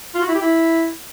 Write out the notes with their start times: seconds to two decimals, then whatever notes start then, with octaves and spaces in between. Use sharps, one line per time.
0.15 F4
0.21 F#4
0.28 E4
0.35 G4
0.41 E4